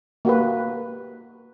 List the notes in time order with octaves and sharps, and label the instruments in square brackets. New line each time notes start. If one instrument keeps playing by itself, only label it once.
[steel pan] A#3 F#4 G4 B4